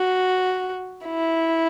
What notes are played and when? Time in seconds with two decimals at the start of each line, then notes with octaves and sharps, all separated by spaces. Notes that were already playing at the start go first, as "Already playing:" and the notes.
Already playing: F#4
1.06 E4